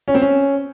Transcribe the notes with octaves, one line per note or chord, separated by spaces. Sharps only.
C#4
C4
C#4